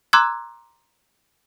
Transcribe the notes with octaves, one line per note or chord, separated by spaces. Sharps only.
A#5 C6 D6 E6 F#6 G#6